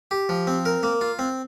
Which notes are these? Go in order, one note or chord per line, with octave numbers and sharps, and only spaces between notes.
G4
F3
C4
A#4
A#3
F4
C4